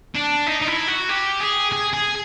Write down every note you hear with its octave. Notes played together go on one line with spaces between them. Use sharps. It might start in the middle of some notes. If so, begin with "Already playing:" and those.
D4
D#4
D#4
E4
F#4
G4
G#4
G#4
G#4